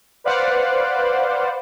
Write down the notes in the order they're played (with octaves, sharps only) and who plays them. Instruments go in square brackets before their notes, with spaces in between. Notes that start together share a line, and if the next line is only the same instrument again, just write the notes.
[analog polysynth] B4 C5 D5 F5 F#5